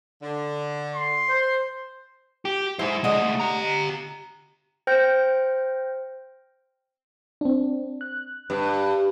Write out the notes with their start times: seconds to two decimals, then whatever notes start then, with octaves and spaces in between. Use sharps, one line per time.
0.21 D3
0.95 C6
1.29 C5
2.45 G4
2.79 G#3 E4 C5
3.04 D2 D3 G#3 D#5
3.22 C2 A3
3.40 G4 A#5
4.87 C5 G5 F6 G6 A#6 C#7
7.41 C4 D4
8.01 F#6
8.50 G2